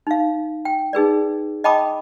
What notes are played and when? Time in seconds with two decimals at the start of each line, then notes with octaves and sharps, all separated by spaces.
0.07 D#4 F5
0.65 G5
0.93 D#4 G#4 B4 D5
1.64 D#5 G5 A5 B5 D6 D#6